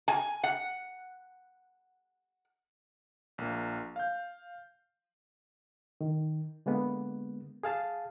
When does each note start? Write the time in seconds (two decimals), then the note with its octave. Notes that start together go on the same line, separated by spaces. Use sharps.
0.08 G#5
0.44 F#5
3.38 A#1 A#3
3.96 F5 G6
6.01 D#3
6.66 D3 G#3 A#3 B3
7.63 G#4 F5 A5